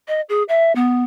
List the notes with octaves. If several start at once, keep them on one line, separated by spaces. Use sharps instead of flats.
D#5
G#4
E5
B3